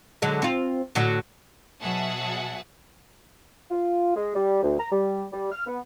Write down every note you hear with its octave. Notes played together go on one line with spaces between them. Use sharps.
D3 F#3 G#3
C4 F4
A2 D3 F#3
B2 F#3 G#4 E5 F#5 A5
F4
G#3
G3
D2
A#5
G3
G3
F6
B3